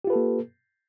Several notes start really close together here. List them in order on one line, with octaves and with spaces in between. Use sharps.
G4 F4 B4 A4 A#3